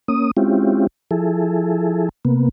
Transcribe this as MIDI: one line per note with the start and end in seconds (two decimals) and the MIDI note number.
0.08 0.31 58
0.08 0.31 61
0.08 0.31 87
0.37 0.87 56
0.37 0.87 60
0.37 0.87 61
0.37 0.87 64
0.37 0.87 65
0.37 0.87 67
1.11 2.09 53
1.11 2.09 64
1.11 2.09 68
1.11 2.09 69
2.25 2.49 48
2.25 2.49 58
2.25 2.49 59